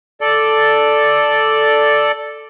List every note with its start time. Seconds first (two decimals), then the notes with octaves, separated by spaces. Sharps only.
0.21 A4 D5